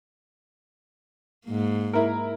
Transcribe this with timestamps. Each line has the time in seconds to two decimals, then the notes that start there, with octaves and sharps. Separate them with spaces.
1.46 G#2 A#3
1.93 E4 A#4